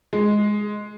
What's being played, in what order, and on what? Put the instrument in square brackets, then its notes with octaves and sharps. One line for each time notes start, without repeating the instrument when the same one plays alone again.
[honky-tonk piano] G#3